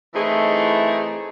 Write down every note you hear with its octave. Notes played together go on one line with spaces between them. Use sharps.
E3 A3 C4 D#4 E4 G#4